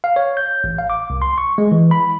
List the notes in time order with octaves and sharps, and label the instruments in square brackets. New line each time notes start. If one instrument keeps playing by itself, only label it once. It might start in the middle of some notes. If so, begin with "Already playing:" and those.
[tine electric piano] F5
C#5
G6
A1
F5
D6
C2
C6
C#6
G#3
E3
B5